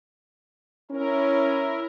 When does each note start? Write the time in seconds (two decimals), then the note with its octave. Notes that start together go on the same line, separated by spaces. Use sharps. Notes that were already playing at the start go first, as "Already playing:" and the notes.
0.91 C#4 E4 A#4